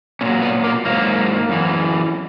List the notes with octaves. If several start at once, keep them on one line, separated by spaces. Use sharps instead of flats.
A#2 F#3 C#4
B3
A#3
G#2 F#3 A#3
F#2 E3